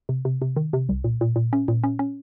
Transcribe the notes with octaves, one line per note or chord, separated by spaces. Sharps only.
C3
C3
C3
D#3
C3
C2
A#2
A#2
A#2
C#4
A#2
C#4
C#4